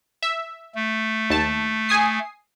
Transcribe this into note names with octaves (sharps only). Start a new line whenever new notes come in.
E5
A3
D#2 A5
G#5 D#6 C7